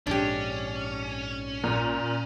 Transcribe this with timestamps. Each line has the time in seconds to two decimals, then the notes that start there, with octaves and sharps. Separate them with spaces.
0.07 A#1 F2 G#2 C#4 D4 G4
1.64 A#2